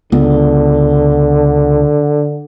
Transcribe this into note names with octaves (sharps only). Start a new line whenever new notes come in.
C#2 D3 B3